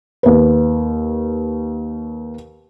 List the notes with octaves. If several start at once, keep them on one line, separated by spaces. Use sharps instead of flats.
D#2 B4